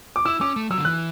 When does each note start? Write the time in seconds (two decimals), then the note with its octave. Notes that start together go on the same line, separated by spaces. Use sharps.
0.16 D6
0.25 E4 E6
0.41 C#4 D6
0.56 A3
0.70 F#3 E6
0.78 D3
0.85 E3 F#6